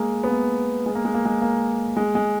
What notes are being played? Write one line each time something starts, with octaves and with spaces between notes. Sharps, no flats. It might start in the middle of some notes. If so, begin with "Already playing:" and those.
Already playing: G#3 A#3
B3
A#3
G#3
A#3
G#3
A#3
G#3
A#3
G#3
G#3